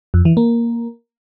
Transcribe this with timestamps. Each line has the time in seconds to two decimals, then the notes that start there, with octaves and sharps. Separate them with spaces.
0.14 F2
0.25 E3
0.37 A#3